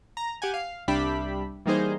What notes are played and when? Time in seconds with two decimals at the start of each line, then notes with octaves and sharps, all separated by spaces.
0.17 A#5
0.42 G4 F#5 G#5
0.54 F5
0.88 C2 G3 D4 G4 E5 B5
1.66 E3 G3 A#3 D#4 G#4 C5